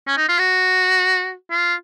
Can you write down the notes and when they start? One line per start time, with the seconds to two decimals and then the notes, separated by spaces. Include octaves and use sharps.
0.07 C#4
0.17 D#4
0.28 F4
0.39 F#4
1.51 F4